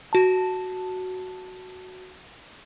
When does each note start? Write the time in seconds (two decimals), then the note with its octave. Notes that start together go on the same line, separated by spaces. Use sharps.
0.13 F#4 A5